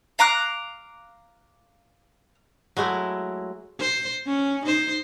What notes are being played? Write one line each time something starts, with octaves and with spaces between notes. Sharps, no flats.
F5 A#5 D6 F#6
F#3 G#3 A3 E4
C5
C#4
D#4 C5